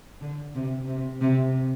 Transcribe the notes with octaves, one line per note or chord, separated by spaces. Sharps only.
D3
C3
C3
C3